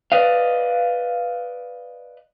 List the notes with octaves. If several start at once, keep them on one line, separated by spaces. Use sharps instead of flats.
B4 D5 D#5 F5